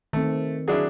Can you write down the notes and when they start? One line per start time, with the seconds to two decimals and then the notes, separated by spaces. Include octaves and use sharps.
0.13 D#3 A3 C4
0.68 F#3 D4 E4 G#4